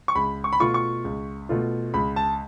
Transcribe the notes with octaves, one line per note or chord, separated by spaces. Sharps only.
C#6
C#2 B5
C#6
B5
B2 A3 F4 C#6
C#6
C#2
B2 A3 F4
C#2 B5
A5